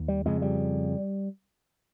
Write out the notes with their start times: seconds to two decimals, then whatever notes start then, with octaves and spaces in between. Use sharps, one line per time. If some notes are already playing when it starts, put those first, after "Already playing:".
Already playing: D#2
0.08 G3
0.25 F2 C#3 G#3
0.42 G3